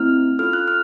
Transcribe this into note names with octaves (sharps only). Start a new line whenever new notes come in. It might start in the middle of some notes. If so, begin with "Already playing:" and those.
Already playing: A3 C4 E4 F6
C#4 F4 A4 F6
F#6
F6